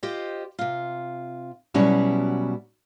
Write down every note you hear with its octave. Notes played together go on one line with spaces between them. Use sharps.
F4 G4 C5 D#5
C3 F4
B2 F#3 G3 C#4 E4 F#4